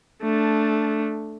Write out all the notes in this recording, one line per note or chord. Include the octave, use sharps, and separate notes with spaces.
A3 D4